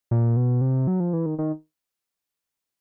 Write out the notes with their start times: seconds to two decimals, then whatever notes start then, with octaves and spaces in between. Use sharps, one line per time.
0.11 A#2
0.36 B2
0.61 C3
0.87 F#3
1.00 F3
1.13 E3
1.26 D#3
1.39 D#3